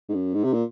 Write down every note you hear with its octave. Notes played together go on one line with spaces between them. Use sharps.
G#2
F#2
G#2
C3
A#2